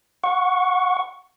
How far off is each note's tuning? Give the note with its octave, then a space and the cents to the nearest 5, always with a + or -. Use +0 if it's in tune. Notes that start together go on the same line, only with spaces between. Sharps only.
F#5 -25 C#6 +0